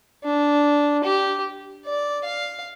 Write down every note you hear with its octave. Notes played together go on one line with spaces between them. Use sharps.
D4
G4
D5
F5